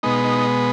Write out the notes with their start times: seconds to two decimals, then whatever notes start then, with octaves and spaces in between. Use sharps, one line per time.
0.03 B2 G#3 B3 D#4
0.24 D#4